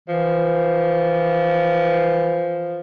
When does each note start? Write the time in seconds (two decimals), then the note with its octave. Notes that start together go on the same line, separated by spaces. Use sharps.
0.09 E3 F3